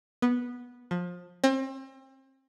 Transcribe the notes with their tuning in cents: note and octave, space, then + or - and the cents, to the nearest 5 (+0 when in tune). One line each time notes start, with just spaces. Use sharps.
B3 -10
F3 +25
C4 +35